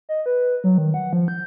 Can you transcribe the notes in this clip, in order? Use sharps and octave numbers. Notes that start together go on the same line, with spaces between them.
D#5
B4
F#3
D#3
F#5
F3
G6